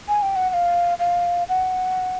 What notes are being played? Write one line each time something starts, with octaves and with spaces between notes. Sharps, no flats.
G#5
G5
F#5
F#5
F5
F5
F#5